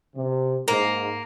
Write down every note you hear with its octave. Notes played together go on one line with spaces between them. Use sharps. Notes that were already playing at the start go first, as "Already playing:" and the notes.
C3
G#2 A#3